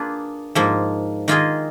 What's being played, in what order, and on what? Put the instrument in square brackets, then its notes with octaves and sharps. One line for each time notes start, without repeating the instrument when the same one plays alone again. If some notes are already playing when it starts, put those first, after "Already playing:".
Already playing: [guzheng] A#3 D4 F4 G#4 B4
G#2 F3 A#3
D#3 A#3 F4 G#4 D#5